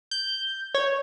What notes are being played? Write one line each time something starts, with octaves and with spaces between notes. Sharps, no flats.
G6
C#5